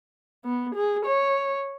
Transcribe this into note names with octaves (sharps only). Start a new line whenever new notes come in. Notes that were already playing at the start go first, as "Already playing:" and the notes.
B3
G#4
C#5